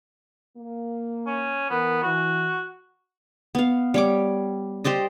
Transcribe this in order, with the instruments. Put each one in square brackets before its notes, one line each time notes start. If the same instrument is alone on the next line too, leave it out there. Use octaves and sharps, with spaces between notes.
[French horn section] A#3
[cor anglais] C#4
[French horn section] E3 A#4 [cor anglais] B3
[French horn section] E3 [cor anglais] F#4
[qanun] B3 F5
G3 C#5 D6
G4 C5 D5 D#5